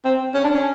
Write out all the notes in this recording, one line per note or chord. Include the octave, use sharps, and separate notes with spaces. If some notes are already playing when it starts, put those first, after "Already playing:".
C4
C#4
D4
C#4